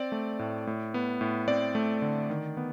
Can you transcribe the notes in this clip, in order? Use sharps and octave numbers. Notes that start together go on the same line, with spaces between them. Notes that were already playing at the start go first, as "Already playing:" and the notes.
Already playing: C4 D5
A3
A2
A2
B3
A2
C4 D5
A3
D3
D#3
B3